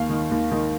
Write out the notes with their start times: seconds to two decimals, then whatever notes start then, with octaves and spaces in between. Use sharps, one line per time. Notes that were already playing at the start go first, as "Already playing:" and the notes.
Already playing: D#2 F5
0.09 D#3
0.31 D#2
0.51 D#3